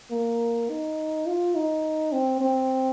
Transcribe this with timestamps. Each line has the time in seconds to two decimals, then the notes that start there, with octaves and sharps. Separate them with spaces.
0.11 A#3
0.69 D#4
1.27 F4
1.55 D#4
2.12 C4
2.41 C4